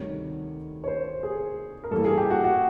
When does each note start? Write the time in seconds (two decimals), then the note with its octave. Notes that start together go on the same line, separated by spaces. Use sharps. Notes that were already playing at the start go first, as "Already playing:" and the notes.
Already playing: D2 C3 D#3 G3 C#5
0.84 C#5
0.88 C5
1.23 G#4
1.84 A#4
1.91 G2 E3 G3 A#3 A4
2.05 G#4
2.18 G4
2.30 F#4
2.44 F#4